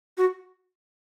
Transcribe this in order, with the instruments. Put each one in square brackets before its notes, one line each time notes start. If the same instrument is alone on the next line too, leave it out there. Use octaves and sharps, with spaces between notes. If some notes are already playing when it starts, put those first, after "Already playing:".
[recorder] F#4